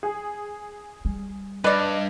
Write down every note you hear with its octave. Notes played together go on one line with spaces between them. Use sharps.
G#4
G3
G2 B4 D5 D#5